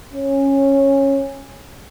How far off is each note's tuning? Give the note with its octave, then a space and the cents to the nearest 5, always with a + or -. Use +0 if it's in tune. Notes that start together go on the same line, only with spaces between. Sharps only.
C#4 -15